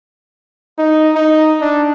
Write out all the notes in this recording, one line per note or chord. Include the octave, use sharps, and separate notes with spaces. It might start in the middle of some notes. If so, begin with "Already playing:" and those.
D#4
D#4
D4